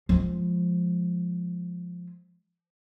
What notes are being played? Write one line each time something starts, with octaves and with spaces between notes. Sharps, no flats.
F3 G#3